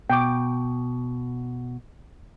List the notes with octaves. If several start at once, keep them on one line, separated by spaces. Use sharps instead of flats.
B2 G5 D6